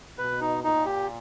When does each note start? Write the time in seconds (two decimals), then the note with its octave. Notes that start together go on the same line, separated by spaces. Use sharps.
0.18 B2 B4
0.41 D#4
0.63 A#2 D#4
0.85 G4